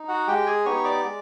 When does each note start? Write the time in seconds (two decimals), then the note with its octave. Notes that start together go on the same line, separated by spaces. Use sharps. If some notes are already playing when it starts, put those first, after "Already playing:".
Already playing: D#4
0.08 F#4 F#5
0.27 G#3 G4 G5
0.46 G#4 G#5
0.65 B3 D#4 G4 C#5 C#6
0.84 D5 D6
1.04 G#3